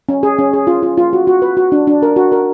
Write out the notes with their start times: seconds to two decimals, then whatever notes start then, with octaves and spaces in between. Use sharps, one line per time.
0.09 C#4
0.23 G#4
0.38 C#4
0.53 G#4
0.67 F4
0.83 F4
0.97 F4
1.13 F#4
1.27 F#4
1.42 B4
1.57 F#4
1.72 D4
1.87 D4
2.02 A#4
2.16 F#4
2.32 A#4